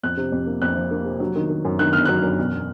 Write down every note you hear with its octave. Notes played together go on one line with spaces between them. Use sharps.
F2 F#6
C3
F2
A#3
F2 F#6
F3
A#3
C3
F#3
D#3
D#3
F#2
D#3 F#6
G1 F6
F#3 F#6
F#2
E1